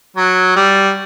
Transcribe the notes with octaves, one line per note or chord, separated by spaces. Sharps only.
F#3
G3